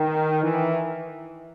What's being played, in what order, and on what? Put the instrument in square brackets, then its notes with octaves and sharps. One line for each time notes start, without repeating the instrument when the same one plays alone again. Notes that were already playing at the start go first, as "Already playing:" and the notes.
Already playing: [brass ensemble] D#3
E3